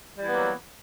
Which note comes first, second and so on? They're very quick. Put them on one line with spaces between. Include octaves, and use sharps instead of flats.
G3 E3 B3 A#3 F#3